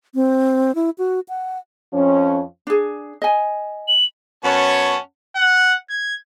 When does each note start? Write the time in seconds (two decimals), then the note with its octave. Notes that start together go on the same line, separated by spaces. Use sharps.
0.15 C4
0.75 E4
0.98 F#4
1.29 F#5
1.94 F2 F3 C#4
2.67 D4 G#4
3.22 D#5 G#5
3.88 F#7
4.44 F#2 B3 C#4 C#5 F#5 A5
5.36 F#5
5.90 G#6